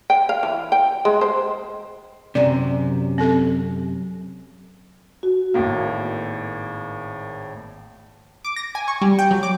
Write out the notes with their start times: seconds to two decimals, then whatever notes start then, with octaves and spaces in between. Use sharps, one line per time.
0.10 G5
0.29 F5
0.43 E3
0.72 G5
1.05 G#3
1.21 C5
2.35 F#2 C3 D5
3.18 C4 A4
5.23 F#4
5.54 G#1 A2 A#3
8.45 D6
8.56 A#6
8.75 G#5
8.88 C#6
9.02 G3
9.19 G5
9.31 F#3
9.43 D6